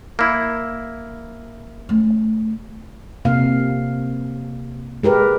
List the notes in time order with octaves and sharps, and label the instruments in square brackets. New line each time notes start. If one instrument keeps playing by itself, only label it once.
[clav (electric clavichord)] A#3 E4
[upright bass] A3 C#4
[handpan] C3 A#3 F5
G#3 G4 A#4 B4